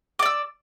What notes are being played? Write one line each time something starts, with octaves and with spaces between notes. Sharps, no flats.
D5 D6 E6